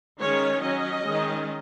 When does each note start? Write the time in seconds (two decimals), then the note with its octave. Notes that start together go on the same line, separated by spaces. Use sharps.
0.20 D#3 G#3 C#4 C#5
0.62 F#3 C#4 D#5
1.06 D#3 G#3 C#4